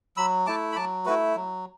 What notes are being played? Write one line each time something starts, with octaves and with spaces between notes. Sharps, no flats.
F#3 B5 E6
A3 E4 A5 D6
B5
F#3 A5 D6
A3 E4 F#4 B4
F#3